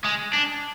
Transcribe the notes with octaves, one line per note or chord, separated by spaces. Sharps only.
G#3
D4